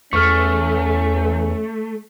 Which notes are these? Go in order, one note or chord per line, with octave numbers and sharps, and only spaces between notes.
E2 A3 C#4 C#6 F6